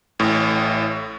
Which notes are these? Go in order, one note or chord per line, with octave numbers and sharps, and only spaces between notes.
A1 A2